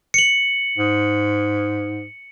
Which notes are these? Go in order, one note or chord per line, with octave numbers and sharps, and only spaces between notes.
C#7 F#7
G#2